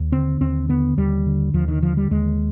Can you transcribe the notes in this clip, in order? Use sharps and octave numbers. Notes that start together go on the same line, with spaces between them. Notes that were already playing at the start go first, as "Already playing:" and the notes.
Already playing: D#2
D3 C4
D#2 C4
D3 B3
D#2 G3
D3
D#2 F3
D#3
D3 F3
G3
D#2 G#3